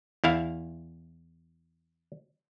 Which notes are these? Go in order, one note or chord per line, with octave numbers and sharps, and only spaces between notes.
E2 E4 F5